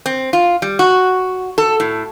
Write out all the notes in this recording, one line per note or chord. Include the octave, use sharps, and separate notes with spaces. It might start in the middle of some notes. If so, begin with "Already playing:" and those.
C4
F4
G3
F#4
A4
A2